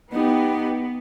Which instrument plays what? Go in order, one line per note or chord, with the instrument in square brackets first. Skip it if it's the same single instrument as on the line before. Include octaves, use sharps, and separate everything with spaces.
[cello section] B3 [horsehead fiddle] D#4 G4